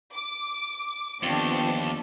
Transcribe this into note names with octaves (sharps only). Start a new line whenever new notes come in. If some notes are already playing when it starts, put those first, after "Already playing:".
D6
D#2 D3 F3 B3 C4 D4